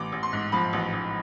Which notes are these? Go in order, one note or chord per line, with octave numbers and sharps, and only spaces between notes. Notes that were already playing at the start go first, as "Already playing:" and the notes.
Already playing: A1 D6
A1
C6
G#2
F3 B5
A1
A1